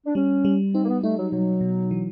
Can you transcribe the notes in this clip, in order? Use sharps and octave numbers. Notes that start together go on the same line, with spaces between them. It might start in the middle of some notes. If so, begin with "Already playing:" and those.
D4
G3 C#4
G3
C4 D#4
A#3
B3
A3 D#4
F#3
B2 F#3
B2
E3